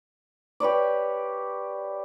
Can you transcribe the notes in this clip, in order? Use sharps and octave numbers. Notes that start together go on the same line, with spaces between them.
G4 B4 C#5 D5